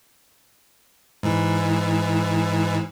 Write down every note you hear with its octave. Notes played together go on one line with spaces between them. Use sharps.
G#2 E3